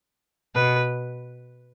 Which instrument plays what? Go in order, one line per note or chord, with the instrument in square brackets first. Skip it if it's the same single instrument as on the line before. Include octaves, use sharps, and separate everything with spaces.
[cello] B2 [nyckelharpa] B4